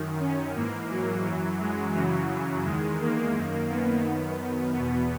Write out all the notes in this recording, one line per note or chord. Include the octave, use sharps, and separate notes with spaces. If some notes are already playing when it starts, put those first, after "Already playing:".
Already playing: F#2 D#3
C#4
G#2 E3 A#3
F#3
F#2 E3 F#3
G#3
F#2 C#3 E3 F#3
E2 D#3 G#3
A#3
F#2 D#3
B3
F#2 D#3
E2 B2 B3